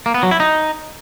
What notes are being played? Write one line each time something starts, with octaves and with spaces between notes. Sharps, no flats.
A#3
B3
F#3
E4
D#4